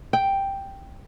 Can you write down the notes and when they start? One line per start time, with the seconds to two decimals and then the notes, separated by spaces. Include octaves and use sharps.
0.13 G5